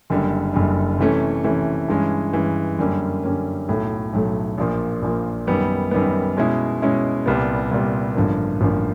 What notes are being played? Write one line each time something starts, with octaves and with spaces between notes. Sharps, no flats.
F#1 F#2 D3 G3
F#1 F#2 D3 G3
C3 E3 A3 C#4
C3 E3 A3 C#4
G2 E3 G#3 C#4
G2 E3 G#3 C#4
F#2 D3 G3 A#3 C#4
F#2 D3 G3 A#3 C#4
B1 A2 F#3 A3
B1 A2 F#3 A3
A#1 A#2 F3 A#3
A#1 A#2 F3 A#3
F#2 D#3 G3 B3
F#2 D#3 G3 B3
B2 G#3 C#4 E4
B2 G#3 C#4 E4
C2 A#2 G3 B3
C2 A#2 G3 B3
A1 G2 D3 F3 A#3
A1 G2 D3 F3 A#3